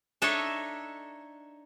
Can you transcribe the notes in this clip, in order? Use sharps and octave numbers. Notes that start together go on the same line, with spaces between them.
D4 D#4 A4 C#5 E5